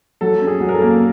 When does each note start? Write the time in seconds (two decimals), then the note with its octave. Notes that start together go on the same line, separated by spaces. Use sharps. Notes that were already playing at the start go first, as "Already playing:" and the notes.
0.21 F#3 A4
0.42 C#4
0.47 G#4
0.61 F#3
0.69 A#4
0.74 A4
0.82 A#3